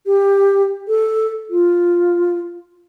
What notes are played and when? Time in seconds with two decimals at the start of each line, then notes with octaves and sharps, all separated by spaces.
0.06 G4
0.88 A4
1.50 F4